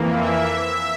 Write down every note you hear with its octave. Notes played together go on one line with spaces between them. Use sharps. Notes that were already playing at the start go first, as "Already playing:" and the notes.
Already playing: F2 E3 A#3
E5